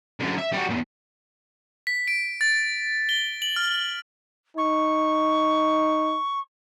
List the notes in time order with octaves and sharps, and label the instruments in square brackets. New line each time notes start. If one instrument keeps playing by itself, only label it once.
[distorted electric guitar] F#2 D3
E5
G3 F#4
E2 A#2
[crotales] B6
D7
A6
G7
F#7
F6
[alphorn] D#4 [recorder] C#6